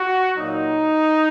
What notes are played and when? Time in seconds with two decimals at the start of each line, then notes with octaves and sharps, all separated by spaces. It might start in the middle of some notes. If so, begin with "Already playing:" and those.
Already playing: F#4
0.37 A#2 F#3 D#4